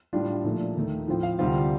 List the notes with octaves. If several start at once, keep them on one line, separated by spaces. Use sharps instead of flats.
A2 G3 D4 F4
A#2 F3 A3 D4
D#2 D#3 A3
A2 F3 C4 F4
F5
D2 C3 G3 C4 F4